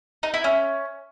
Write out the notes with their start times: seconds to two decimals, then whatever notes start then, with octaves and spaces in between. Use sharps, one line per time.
0.23 D#4
0.34 E4
0.44 C#4